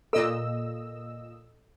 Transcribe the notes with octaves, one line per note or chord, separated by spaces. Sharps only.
A#2 A4 D#5 E6